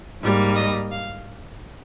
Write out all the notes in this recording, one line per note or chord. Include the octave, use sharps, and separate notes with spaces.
G#2 G3 A#3
D#5
F5